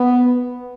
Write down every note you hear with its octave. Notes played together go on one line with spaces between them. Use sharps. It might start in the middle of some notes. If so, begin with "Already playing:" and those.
Already playing: B3